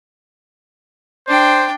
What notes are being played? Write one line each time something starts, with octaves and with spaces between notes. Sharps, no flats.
D4 C5 G5